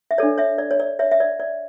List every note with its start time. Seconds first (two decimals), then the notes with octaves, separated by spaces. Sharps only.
0.11 E5
0.18 D4 A4 C#5 D5
0.38 C#5 E5
0.58 D5
0.71 C#5
0.80 D5
0.99 C#5 E5
1.11 E5
1.20 D5
1.40 D5